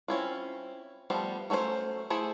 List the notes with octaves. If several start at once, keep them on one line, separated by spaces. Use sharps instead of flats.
C4 C#4 E4 F4
F3 G3 A3 B3 C5
F#3 A3 C#4 E4 C5
A3 E4 G#4 C5